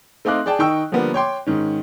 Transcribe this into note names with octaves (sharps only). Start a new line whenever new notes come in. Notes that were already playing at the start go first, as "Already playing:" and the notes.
A3 C4 D#4 F5 D6 F#6
G#4 D5 G5 A5
D#3 D#4 G5 C#6 E6
D3 F3 G3 A#3 B3
C#5 G5 C6 D6
G#2 D#3 C#4